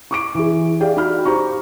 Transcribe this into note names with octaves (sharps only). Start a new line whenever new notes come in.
C#6 D6 D7
E3 G#4
G4 G#4 D5 F5 G5
D#4 F#4 B5 F6
G4 C5 A#5 C#6